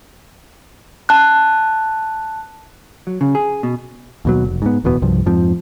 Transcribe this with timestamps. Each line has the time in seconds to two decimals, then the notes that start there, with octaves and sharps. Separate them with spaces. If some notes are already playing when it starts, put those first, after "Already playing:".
1.09 A5 F#6
3.07 F#3
3.21 C#3
3.35 G#4
3.63 B2
4.25 D#2 B2 F#3
4.45 F1
4.62 G#2 B3
4.84 D1 E2 B2 B3
5.02 C2 G2 F3
5.26 F2 G#2 F3 C4